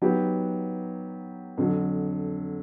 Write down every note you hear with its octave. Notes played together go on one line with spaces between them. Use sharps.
F#3 B3 D#4 G4
F2 D3 F#3